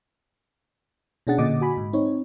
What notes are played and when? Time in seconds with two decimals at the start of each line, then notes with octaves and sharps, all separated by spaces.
1.27 B2 C#4 D4 G#4 F#5 A6
1.38 A#2 D3 D#5 D6 D#6
1.61 F#4 G#5 B5
1.77 G#2
1.93 C4 D#4 C#5